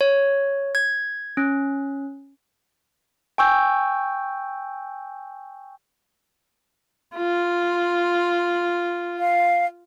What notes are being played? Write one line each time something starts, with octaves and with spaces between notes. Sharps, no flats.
C#5
G#6
C#4
G5 G#5 C#6 E6 G6
F4
F5